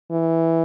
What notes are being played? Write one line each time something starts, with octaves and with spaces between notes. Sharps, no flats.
E3